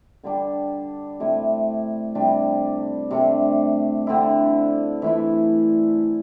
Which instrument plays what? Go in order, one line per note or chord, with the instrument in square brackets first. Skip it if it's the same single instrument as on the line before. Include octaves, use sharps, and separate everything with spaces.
[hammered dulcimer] D3 G3 D4
C3 A3 E4
C3 G3 D4
C3 A3 D4
D3 C4 E4
E3 A3 E4